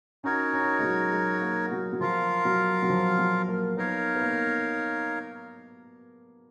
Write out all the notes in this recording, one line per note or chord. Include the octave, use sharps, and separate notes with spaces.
C#4 D#4 F#4 A#4 C#5
C#4
G#3
F#3
G#3
A#3
F#3
F#3
F3 F4 A#4 F5
F#3
F#3
F3
F#3
A#3
B3 D#4 A#4 C#5 F5
B3
A#3